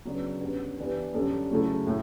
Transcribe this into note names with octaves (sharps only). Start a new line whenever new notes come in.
C#3 F#3 B3 D4
F#2 D3 G3 B3
E3 B3 D4 G4
F#2 D3 G3 D4 A4
C#3 F#3 A3 E4 A4
A2